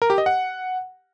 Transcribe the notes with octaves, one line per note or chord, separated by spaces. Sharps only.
A#4
G4
D#5
F#5